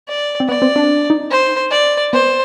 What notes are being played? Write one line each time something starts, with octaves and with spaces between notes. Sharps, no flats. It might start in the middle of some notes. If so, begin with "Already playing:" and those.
D5
C4
B3 D5
C4
D4
D#4
C5
D5
B3 C5